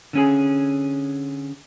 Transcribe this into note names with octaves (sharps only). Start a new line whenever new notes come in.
D3 C#4 G#4